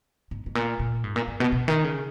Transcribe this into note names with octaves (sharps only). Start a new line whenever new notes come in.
G#2
G#2
A#2
A#2
G#2
A#2
G2
B2
B2
D#3
C#3